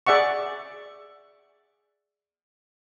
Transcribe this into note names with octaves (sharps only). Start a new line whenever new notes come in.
G#4 D5 E5 F#5 C#6